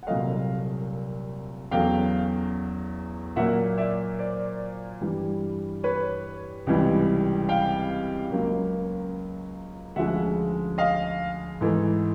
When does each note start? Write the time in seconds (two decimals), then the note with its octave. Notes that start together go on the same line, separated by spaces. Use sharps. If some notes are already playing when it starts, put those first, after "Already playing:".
0.03 F#5
0.07 C2 A#2 F#3 A3 D#5 F5
1.71 E2 C#3 F#3 A3 F5 G5
3.36 A#2 F#3 A#3 E5 F#5
3.78 D5 E5
4.19 C5 D5
5.01 G2 E3 G3
5.83 B4 C#5
6.67 C#2 C3 E3 G3
7.49 F5 G5
8.31 C#2 C#3 F#3 A#3
9.96 D2 C#3 F3 G#3 E5 F#5
10.78 D#5 F5
11.61 G#2 E3 A3